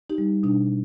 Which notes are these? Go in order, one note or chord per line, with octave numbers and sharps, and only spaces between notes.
D#4 G4
G3
B2 D4